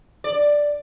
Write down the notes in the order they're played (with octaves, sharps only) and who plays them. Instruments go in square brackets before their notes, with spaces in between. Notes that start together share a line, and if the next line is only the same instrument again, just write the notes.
[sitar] D5